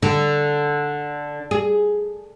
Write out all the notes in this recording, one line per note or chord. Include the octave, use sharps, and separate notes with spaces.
D3
G#4